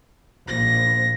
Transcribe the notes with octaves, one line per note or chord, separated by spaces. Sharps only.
A#1 A#6